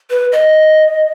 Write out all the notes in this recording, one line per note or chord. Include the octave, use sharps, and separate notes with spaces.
B4
D#5